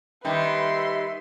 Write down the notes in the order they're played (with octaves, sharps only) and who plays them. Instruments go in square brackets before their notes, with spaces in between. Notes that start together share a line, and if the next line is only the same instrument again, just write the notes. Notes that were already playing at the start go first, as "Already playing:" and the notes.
[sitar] D#3 G3 [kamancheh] B4 C6 [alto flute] E5